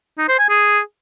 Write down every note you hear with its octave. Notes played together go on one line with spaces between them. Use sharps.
D#4
C5
G#5
G#4